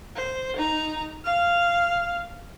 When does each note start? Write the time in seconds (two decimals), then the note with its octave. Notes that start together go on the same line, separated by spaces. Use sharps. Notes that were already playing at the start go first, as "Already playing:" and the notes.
0.16 C5
0.57 D#4 A#5
1.25 F5 F6